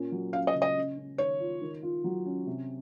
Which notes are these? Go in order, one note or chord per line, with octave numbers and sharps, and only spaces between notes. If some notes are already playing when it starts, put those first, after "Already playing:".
Already playing: A#2 C#4
F#3
C#4 F5
D#5
C#3
D#5
C#4
C#4
D#3 C#5
F4
D#3
F4
F#3
C#4
C3